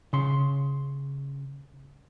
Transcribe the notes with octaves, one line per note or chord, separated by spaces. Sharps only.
C#3 C6